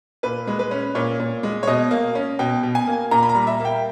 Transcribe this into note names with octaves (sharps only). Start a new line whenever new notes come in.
A#2 B4
G#3
B4
C#4
A#2 C#5
A#2
G#3
C#5
B2 D#5
A#3
C#4
B2 G5
B2
G#5
A#3
A#2 A#5
B5
A#5
G3
E5
A#3
G5